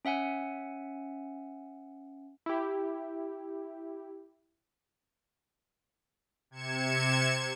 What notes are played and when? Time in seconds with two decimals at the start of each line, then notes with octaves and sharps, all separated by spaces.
0.05 C#4 E5 F#5 G#5
2.46 E4 G4
6.51 C3 G#6 C#7 E7